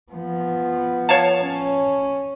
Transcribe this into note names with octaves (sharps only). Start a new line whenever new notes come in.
F3 B3
C#5 F5 A5
C#4